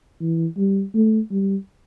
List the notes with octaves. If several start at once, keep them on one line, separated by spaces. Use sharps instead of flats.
E3
G3
A3
G3